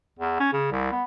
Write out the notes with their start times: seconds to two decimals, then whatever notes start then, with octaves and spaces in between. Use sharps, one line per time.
0.19 E2
0.40 C#4
0.53 C#3
0.72 C2
0.92 B3